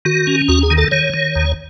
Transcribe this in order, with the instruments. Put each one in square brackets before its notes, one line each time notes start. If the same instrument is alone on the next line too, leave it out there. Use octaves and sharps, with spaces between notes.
[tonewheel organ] D#3 F#4
C#4
D#2 F#4
G#4
D#3
A4
D#3 C#5
D#3
D#2